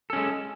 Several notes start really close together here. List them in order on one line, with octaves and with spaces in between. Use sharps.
A4 C#4 G#3